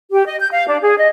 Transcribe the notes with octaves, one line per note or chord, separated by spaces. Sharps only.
G4
D#5
G6
F5
D4
G#4
D#5